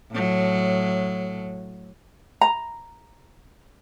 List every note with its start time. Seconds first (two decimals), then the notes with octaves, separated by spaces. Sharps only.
0.12 A2 F#3
2.41 A#5